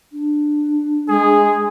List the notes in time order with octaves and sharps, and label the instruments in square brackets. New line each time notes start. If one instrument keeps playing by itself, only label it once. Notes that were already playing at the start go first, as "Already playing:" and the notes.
[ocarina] D4
[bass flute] G#3 [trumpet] G#4